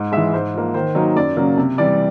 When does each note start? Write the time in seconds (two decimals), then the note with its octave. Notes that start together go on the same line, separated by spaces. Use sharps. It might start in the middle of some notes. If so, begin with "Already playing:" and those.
Already playing: G#2
0.12 G#3 E5
0.17 E3
0.33 G#2 C5
0.54 F3 A#3
0.74 D#3 C5
0.95 F#3 A#3 D#4
1.16 F#2 D5
1.37 C#3 F#3 A#3
1.57 C3
1.78 E3 G3 D5